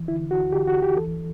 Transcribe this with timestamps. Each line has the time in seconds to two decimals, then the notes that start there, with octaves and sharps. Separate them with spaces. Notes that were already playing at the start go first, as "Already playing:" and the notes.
Already playing: E3
0.08 D3 E4
0.23 D3
0.31 F#4
0.37 D2
0.52 D3 G4
0.67 D2 F#4
0.82 D2 G4
0.97 E3 A4